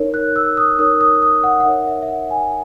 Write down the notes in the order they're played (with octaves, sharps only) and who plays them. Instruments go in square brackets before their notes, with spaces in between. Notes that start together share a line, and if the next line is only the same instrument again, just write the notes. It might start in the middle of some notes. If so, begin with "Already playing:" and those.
Already playing: [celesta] D#4 A#4 C#5
F#6
E6
D#6
D#4 A#4 C#5 D#6
D#6
D#6
F#5
F#5
D#4 A#4 C#5 E5
E5
E5
F#5
G#5